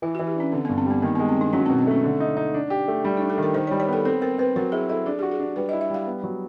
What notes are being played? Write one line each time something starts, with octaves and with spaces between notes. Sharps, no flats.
E3 E4
F#4
E3
G4
C#4 D4
D3 C4
B3
G2
C4
G3 B3
D#3 A#3
B3
G#3
C4
D#3 D4
F#3 C#4
C4
B2
C4
A3 C#4
D3
D#4
D#4
D4
G4
A3
G3 D4
D#4
D4
A4
D#3 A#4
D#3 C5
C#5
G3
C#5
B3 A4
C4 A4
C4 A#4
C4 B4
F#3 A#4
E4 G#4
E4 A4
D4 G#4
F#4 G4
G#4
D4
G3 B4
D#5
E4
E5
G3 F5
B3
F#3